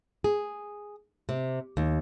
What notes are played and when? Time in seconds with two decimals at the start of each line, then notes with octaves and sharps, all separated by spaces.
0.24 G#4
1.29 C3
1.77 D#2